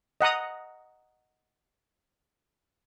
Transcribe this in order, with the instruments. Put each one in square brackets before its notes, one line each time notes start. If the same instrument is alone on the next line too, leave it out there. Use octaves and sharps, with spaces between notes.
[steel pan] D#5 F#5 A#5 D#6